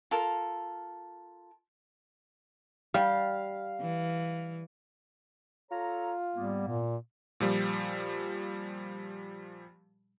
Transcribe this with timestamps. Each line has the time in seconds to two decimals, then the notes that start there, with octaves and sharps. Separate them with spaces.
0.11 F4 A4 A#4
2.94 G3 F5
3.81 E3
5.71 F4 A4 C#5 A#5
6.36 G#2 G3 A#3 B3
6.68 A#2
7.40 A#2 F3 G3